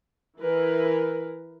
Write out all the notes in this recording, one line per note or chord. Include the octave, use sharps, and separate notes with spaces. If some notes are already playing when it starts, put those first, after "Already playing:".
E3 A#4 B4